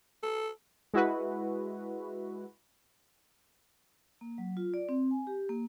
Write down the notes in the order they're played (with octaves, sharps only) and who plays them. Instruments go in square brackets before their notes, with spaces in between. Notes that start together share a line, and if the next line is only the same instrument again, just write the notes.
[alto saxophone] A4
[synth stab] G#3 E4 F#4 B4
[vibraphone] A#3
F#3
F4
D5
C4
G#5
G4
A#3